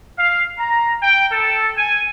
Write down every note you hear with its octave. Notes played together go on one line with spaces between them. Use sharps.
F5
A#5
G5
A4
G#5